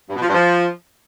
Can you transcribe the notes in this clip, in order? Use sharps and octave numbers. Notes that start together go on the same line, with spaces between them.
G2
B2
F3
G2
F3